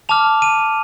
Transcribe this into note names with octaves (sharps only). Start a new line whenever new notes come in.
A5 D6 F6 F7
D#7